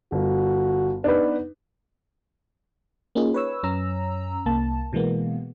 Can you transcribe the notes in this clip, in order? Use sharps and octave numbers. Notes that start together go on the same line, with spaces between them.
G1 F#4
B3 D4 D#4 B4
A#3 C#4 D#4 F4 G#4
B4 C#5 E6
F#2 C#4 A#5 E6
C2 A#3 A5
B2 E3 G#3 A#3 B3